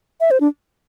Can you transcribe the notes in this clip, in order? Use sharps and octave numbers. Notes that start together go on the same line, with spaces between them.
E5
C5
D4